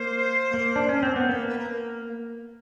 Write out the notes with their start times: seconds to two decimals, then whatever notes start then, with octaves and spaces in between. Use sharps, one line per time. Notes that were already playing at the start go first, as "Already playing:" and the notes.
Already playing: A#3 C5
0.54 A#3
0.76 D4
0.89 C#4
1.03 C4
1.16 B3
1.28 A#3 B4
1.48 B4
1.59 A#4